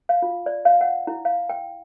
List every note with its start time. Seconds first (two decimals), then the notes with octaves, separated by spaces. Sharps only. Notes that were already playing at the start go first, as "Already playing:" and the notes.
0.09 F5
0.22 F4
0.46 D5
0.65 F5
0.81 F#5
1.07 E4
1.25 F5
1.49 G5